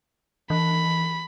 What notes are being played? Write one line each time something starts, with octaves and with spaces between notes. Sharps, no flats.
E3 B5